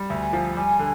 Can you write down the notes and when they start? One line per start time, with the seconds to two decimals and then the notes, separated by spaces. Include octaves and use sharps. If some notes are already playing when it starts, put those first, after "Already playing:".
Already playing: G3
0.09 D2 G#5
0.33 F3
0.56 G3 G#5
0.79 D3